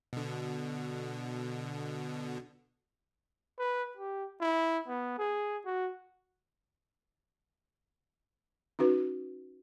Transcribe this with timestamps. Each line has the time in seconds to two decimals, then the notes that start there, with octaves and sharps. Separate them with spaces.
0.13 B2 D3
3.59 B4
3.97 G4
4.41 E4
4.88 B3
5.19 G#4
5.66 F#4
8.79 C#4 D#4 F#4 B4